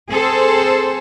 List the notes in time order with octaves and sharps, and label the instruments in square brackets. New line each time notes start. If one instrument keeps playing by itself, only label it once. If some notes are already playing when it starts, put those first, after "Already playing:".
[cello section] C4 G#4 A4 C5